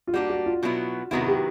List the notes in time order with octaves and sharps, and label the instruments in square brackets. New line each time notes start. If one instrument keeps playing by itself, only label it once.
[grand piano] F4
[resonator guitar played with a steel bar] G3 A#3 D4 [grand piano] F#4
[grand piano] F#4
F4
[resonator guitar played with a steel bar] B2 F#3 B3 E4
[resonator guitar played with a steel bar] C3 D#3 F#3 B3 E4 [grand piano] F#4
[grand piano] F#4
G4